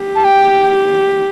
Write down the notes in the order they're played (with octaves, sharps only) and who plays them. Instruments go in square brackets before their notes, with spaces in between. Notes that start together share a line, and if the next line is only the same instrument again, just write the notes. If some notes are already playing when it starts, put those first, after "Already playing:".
Already playing: [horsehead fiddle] G4
[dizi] A5
G5